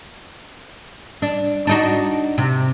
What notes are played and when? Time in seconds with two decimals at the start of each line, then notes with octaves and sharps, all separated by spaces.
1.22 D4
1.67 D4 D#4 F#4
2.38 C3